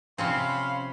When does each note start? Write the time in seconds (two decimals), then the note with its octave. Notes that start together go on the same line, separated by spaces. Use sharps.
0.18 C3 F3 C4 C#4 F5 B5 C6